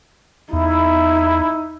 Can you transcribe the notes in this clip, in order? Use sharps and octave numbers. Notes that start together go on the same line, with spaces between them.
E2 D#4 E4